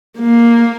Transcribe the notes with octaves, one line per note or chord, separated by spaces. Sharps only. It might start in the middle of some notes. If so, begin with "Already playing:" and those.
A#3